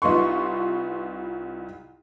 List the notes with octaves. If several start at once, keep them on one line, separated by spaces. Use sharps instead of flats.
C2 D#4 F4 B4 C6 C#6